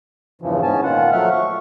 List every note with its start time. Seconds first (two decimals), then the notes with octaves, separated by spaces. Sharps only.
0.42 E2 G2 C#3 E3 F3
0.62 G#2 B3 C#4 G#5 A5
0.83 A#2 D#3 F4 F#5
1.12 F3 F#3 A3 E5 F#5 F6
1.31 C#6